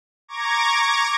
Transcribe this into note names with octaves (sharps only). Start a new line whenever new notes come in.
A#5 C#6 D6 G#6 A#6